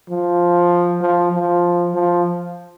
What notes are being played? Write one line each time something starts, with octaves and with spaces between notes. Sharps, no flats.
F3
F3
F3
F3